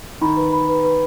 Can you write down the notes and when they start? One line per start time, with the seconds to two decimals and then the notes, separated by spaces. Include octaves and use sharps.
0.21 D#3 B5
0.37 B4
0.53 B5
0.69 B4
0.84 B4